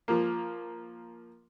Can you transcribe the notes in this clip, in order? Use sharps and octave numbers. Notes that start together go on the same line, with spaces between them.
F3 A#3